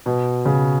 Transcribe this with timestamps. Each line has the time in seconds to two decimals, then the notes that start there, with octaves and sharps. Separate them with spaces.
0.06 B2
0.45 C#3